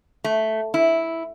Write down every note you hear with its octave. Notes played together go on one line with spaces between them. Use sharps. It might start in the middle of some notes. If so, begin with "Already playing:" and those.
A3
E4